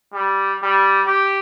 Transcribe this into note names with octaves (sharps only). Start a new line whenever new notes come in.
G3
G3
G4